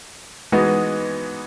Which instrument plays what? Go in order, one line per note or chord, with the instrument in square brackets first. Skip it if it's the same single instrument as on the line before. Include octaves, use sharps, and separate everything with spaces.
[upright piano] E3 G#3 B3 D#4 F#4